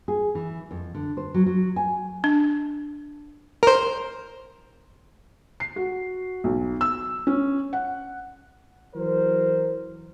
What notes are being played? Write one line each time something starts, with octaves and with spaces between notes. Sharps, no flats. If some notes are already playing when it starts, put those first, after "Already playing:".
G#4
E3
F2
D3
C5
F#3
F#3
G#5
D4
A#4 C5
C7
F#4
B1
E6
C#4
F#5
E3 F#3 A#4 C5